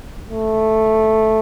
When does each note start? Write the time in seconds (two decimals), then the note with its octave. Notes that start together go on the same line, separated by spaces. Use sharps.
0.29 A3